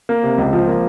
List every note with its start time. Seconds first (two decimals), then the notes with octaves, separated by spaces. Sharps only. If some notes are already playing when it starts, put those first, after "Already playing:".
0.09 A#3
0.23 C3
0.38 C#2
0.53 F3
0.68 A#3